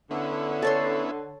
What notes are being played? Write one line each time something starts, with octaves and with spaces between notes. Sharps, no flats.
D3 B3 C#4 E4
A4 C#5 C6